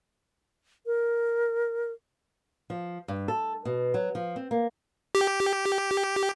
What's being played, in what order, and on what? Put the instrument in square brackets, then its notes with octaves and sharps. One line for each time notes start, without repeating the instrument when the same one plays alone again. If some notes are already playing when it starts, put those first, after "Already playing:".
[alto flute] A#4
[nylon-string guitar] F3
G2
A4
B2
F#3
F3
C4
A#3
[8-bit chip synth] G4